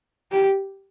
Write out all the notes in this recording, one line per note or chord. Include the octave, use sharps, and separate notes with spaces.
G4